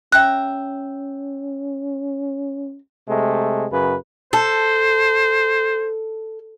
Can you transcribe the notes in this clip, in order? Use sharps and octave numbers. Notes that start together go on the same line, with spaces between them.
C#4 E5 G5 A#5 F#6
C3 G#3 A3
F#2 C#3 B4
A4 C5